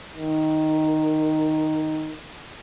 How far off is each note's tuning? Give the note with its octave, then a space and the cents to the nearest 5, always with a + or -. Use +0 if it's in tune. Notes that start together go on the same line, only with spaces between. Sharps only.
D#3 +0